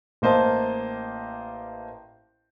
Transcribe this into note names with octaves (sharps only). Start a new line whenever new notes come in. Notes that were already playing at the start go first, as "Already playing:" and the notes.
A1 A#3 C5 D#5 A5